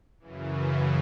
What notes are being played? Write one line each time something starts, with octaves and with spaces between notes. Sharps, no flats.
F#2 C#3 E3